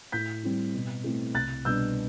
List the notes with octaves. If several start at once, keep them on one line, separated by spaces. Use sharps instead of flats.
A2 G6 B6
G3 C4 E4
B2
A3 C4 E4
C2 F#6 A6
B2 G3 B3 D4 E6 G6